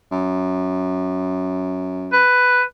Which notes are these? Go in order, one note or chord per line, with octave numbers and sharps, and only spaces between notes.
F#2
B4